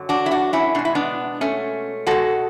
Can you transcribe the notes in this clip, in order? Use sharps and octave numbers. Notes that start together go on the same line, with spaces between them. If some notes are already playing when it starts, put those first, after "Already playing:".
Already playing: F#2 D3 F#3
D4 F#4
E4
D4 F#4
C#4 E4
B2 G#3 D4
E4
B3 D4
A3 C#4
B2 G#3 F#4 A4